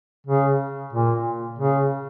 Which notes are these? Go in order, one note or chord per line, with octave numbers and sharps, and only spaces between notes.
C#3
A#2
C#3